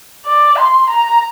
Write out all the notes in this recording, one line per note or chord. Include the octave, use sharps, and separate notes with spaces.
D5
C6
A#5